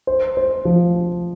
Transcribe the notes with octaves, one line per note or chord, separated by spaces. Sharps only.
C5
C5
F3